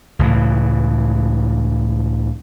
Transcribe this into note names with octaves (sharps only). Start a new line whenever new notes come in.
C#2 A2 C#3 E3